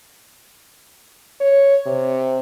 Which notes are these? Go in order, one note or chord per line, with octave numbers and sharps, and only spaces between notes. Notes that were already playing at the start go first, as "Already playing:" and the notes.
C#5
C3